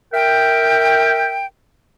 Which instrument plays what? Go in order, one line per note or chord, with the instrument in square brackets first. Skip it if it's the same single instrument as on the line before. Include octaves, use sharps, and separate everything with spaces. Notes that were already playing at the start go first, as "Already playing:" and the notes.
[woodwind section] A#4 E5 G5